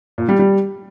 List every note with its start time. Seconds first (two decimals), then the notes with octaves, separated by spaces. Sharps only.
0.18 A#2
0.29 G3
0.39 G3